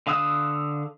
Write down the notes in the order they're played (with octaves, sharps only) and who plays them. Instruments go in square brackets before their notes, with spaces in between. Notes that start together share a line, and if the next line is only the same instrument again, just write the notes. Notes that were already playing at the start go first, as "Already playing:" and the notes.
[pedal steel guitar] D3 F5 D#6 E6 F#6